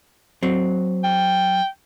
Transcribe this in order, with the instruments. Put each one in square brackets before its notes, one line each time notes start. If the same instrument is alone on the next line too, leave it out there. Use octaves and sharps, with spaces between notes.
[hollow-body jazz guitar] F#3 C4
[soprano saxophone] G5